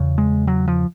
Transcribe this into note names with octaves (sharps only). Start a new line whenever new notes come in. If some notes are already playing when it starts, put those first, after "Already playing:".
Already playing: E2 C#3
G#3
F#3
F3